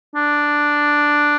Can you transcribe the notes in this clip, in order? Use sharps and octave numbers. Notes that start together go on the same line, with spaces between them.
D4